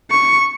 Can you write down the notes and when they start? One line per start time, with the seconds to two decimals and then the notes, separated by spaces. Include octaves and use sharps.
0.11 C#6